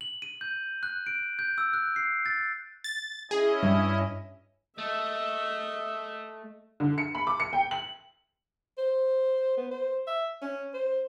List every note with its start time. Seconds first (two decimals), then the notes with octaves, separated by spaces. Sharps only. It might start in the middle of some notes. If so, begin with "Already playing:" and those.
0.01 F#7
0.22 D#7
0.41 G6
0.83 F#6
1.07 D7
1.39 G6
1.58 E6
1.74 F#6
1.96 C7
2.26 A6
2.84 A6
3.31 C#4 E4 G#4 D#5
3.63 G2
4.78 A3 D#5 E5
6.80 D3
6.98 C#7
7.15 B5
7.27 D6
7.40 C#7
7.53 G5
7.71 F#7
8.78 C5
9.57 B3
9.71 C5
10.07 E5
10.41 C#4
10.74 C5